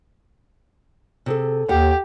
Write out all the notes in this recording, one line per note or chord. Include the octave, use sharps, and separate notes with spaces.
C3 G#4 A4
D#2 G4 F5 F#5